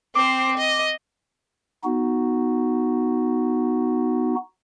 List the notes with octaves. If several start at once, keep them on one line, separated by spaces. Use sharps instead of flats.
C4 C5 D6
D#5
B3 D#4 F#4